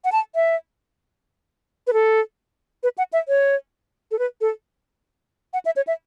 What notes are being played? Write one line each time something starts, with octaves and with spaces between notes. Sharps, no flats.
F#5
A5
E5
B4
A4
B4
F#5
E5
C#5
A4
B4
A4
F#5
E5
C#5
E5